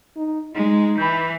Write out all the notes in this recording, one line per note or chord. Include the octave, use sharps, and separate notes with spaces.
D#4
G#3 D#4
E3 B5 G6